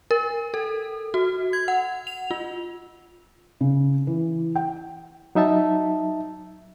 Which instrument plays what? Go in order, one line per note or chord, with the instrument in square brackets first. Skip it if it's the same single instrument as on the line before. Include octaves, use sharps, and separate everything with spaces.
[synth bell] A#4
A4
F#4
G#6
F#5
F7
F4
[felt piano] C#3
E3
G5
[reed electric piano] F#3 D#4 E5 A5